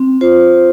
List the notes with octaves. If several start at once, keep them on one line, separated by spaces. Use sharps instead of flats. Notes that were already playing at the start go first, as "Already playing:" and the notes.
Already playing: C4
F4 C5